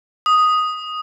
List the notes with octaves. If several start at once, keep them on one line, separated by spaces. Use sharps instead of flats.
D#6